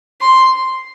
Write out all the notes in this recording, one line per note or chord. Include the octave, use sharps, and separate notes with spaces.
C6